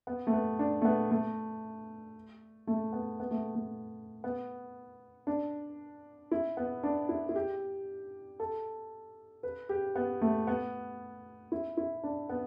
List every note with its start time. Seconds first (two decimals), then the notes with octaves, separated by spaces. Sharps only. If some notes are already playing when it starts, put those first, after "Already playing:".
0.07 B3
0.27 A3
0.33 B3
0.59 D4
0.82 A3
0.85 B3
1.11 A3
2.67 A3
2.93 B3
3.20 B3
3.31 A3
3.55 A3
4.24 B3
5.27 D4
6.31 E4
6.57 B3
6.83 D4
7.09 E4
7.29 E4
7.36 G4
8.40 A4
9.43 B4
9.69 G4
9.95 B3
10.21 A3
10.47 B3
11.52 E4
11.77 E4
12.03 D4
12.29 B3